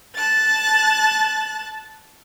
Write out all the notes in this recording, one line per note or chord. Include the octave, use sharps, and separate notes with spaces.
A5 F#6 A6